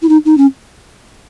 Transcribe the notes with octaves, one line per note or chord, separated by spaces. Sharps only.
E4
D#4
D#4
C#4